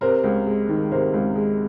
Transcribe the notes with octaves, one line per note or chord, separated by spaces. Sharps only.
C3 A#4 C5
C#2
G#3
D#3
C3 A#4 C5
C#2
G#3